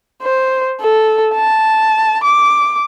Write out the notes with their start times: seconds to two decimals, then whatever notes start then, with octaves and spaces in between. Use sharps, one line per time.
0.22 C5
0.81 A4
1.34 A5
2.24 D6